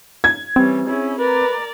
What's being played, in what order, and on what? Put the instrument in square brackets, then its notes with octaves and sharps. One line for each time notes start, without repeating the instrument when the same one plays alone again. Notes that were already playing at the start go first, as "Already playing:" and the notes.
[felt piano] G#6
[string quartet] E3 G3 C#4 [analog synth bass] C4
[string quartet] C#4 E4 G#4
[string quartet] A#4 D5 A#5 [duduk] B4